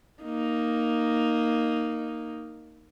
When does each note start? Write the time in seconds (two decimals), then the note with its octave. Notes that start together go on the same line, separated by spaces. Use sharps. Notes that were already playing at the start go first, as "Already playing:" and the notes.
0.24 A#3 D#4